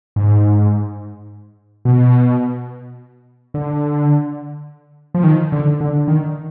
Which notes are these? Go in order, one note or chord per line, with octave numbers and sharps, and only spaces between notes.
G#2
B2
D3
F3
D#3
D3
D3
D#3